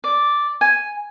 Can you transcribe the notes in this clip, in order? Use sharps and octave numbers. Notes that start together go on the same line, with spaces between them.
D5
G#5